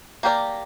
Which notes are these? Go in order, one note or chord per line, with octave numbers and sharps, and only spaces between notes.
A#3 G4 A#4 D5